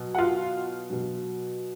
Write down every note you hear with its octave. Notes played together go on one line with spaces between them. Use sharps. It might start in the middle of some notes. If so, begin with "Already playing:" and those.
Already playing: B2 F#3
F#5
F4 F5
B2 F#3